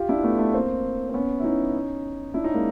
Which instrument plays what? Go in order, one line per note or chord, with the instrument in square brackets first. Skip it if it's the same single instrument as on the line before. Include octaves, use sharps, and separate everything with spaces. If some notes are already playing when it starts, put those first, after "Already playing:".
Already playing: [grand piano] F4 G4
D4 E4
A3 B3
A3 B3
A#3 C4
C4
B3 C#4
E4
C#4 D#4
D4 E4
C#4 D#4
G#3 A#3